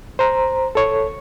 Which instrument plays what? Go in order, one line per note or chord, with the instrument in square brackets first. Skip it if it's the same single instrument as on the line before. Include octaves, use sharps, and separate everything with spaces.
[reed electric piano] C5 A#5
A4 C#5